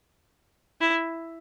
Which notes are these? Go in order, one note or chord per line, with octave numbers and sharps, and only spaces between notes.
E4